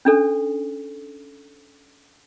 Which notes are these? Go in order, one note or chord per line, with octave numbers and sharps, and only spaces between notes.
C#4 D4 A4